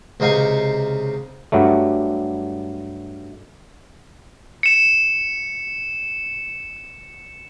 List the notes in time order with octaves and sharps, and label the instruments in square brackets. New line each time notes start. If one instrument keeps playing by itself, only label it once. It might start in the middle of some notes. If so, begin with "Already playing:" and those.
[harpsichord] C#2 C3 D#4 F5 C#6
[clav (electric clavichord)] G2 F#3 G3 A3
[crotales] C#7 E7